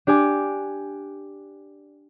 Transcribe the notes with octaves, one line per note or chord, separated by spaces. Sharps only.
D4 G4 D5 G#5 D6